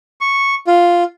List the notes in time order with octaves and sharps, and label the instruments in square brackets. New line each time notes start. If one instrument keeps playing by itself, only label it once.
[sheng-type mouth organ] C#6
F4